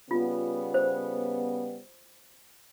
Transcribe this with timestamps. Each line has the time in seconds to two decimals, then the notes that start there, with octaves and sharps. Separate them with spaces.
0.11 C#3 G3 B3 F4
0.74 C5